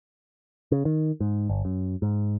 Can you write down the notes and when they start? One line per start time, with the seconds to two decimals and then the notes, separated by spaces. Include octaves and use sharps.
0.72 C#3
0.85 D#3
1.20 G#2
1.49 G1
1.65 F#2
2.02 G#2